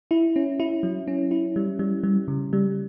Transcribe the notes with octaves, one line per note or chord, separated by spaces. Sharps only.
E4
C#4
E4
F#3
C#4
E4
G3
G3
G3
C#3
G3